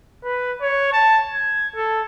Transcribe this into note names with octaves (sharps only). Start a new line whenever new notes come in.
B4
C#5
A5
G#6
A4